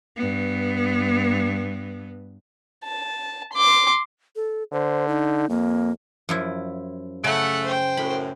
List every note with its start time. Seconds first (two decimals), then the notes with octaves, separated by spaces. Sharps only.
0.16 G2 B3
2.84 A5
3.53 C6 D6
4.36 A4
4.72 D3 C5
5.08 D#4
5.50 F2 A#3
6.29 F#2 F3 E4
7.24 C#3 A3 F#5 F#6
7.64 C5 G5
7.97 F#2 A2 B5